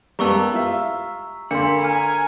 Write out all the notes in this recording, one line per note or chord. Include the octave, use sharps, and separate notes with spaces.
G3 A#3 B3 G4 A5 A#5 C#6 E6
F4 E5
D3 A#3 D4 B5 C6 C#7
A#4 G#5 A#5 F6